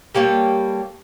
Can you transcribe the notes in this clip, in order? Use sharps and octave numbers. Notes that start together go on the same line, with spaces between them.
G3 A#3 A4 C#5